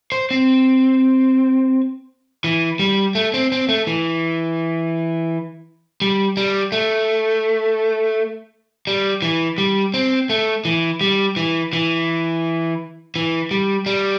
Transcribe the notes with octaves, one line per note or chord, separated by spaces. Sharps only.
C5
C4
E3
G3
A3
C4
C4
A3
E3
G3
G3
A3
G3
E3
G3
C4
A3
E3
G3
E3
E3
E3
G3
G3